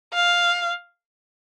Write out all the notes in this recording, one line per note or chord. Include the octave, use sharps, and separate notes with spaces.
F5